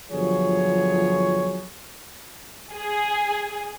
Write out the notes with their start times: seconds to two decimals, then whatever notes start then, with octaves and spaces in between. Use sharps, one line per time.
0.11 G1 F3 F#3 G#4 C#5
2.73 G#4